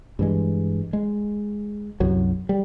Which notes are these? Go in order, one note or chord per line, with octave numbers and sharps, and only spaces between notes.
G2 E3 G#3
G#3
C2 F#2 F#3
G3